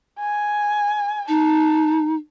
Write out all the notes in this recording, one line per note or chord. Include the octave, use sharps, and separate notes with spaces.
G#5
D#4 A5